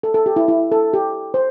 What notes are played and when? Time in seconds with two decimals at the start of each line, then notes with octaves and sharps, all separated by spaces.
0.03 A4
0.14 A4
0.26 G4
0.36 E4
0.48 E4
0.72 A4
0.94 G4
1.34 C5